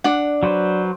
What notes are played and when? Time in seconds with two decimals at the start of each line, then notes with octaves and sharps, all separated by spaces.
0.04 D4 F#5
0.43 F#3 B4 C5